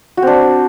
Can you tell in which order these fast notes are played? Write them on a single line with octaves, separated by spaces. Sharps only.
F#4 C4 D4